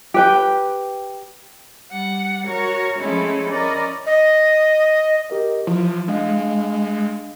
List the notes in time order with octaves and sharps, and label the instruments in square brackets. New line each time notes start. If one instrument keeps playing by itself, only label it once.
[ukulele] G4 B4 G5
[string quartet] G3 F#5
F#4 A#4 C#5
F3 G#3 A3 C4 C#4 E4
C#4 E4 A#4 D5 D#5
[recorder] D#5
[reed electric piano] G4 A#4 D#5
[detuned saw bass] F3 [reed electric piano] E4 F4
[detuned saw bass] G#3 [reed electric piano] D4 D#5 F5